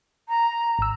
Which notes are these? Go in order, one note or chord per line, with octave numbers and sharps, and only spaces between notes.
A#5
G#1 E6